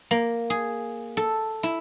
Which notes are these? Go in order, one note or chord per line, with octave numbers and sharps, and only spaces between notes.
A#3
G#4
A4
E4